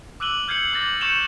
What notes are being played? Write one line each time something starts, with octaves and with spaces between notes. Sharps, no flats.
D6 E6 F#6 D#7 F#7 G7
F6 G6 G#6 C7 C#7 F#7
D6 F6 A6 A#6 F#7
C#6 G6 C#7 E7 F7 G7